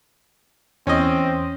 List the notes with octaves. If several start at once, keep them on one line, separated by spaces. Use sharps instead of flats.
E2 C4 C#4 D#5